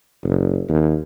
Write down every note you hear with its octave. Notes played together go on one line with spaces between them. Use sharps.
F#1
D#2